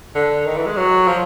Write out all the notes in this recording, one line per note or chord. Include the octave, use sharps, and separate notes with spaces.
D3
D#3
E3
G#3
F#3
F3